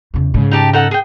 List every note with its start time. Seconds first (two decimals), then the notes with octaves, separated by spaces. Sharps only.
0.14 E2 C#3
0.34 G#2 C#3
0.51 D#4 G4 A5
0.73 D#4 A4 F#5
0.91 G#4 G5